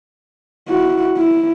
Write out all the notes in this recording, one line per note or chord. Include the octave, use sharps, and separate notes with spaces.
E4 F#4
E4